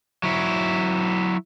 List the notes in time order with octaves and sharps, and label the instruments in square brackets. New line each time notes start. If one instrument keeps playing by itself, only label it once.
[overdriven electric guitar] F#3 E4